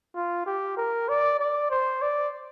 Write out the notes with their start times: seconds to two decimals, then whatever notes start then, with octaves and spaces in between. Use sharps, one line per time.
0.16 F4
0.46 G4
0.77 A#4
1.09 D5
1.40 D5
1.71 C5
2.02 D5